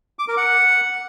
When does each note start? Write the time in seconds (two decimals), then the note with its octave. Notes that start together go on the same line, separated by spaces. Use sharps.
0.19 D6
0.28 A#4
0.37 F#5